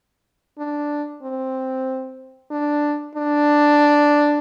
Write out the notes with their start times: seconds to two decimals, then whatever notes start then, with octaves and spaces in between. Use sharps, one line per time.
0.58 D4
1.23 C4
2.51 D4
3.15 D4